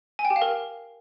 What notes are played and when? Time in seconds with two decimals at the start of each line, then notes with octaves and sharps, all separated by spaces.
0.19 G#5
0.25 G5
0.30 G4
0.36 F5
0.42 A#4